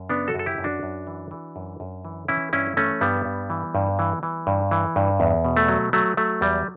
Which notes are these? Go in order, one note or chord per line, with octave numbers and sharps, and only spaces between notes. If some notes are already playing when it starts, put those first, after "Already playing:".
Already playing: F#2
C#3 B3 D4
F#4 A4
F#2
A4
E4 G4
F#2
D4 F#4
F#2
E3
E3
F#2
F#2
E3
E3 C#4 E4
G2 C#4 E4
E3 A3 C#4
G2 G3 B3
G2
E3
G2
E3
E3
G2
E3
G2
E2
B2
A3
F#3
F#3 A3
F#3 A3
E2 G3